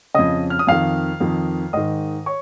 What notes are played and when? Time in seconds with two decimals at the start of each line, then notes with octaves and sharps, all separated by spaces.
0.14 F2 C#3 D#5 D#6
0.50 F6
0.59 D#6
0.67 F2 D#3 F5 F6
1.20 F2 D#3
1.73 G#2 D#3 D#5 D#6
2.26 C#5 C#6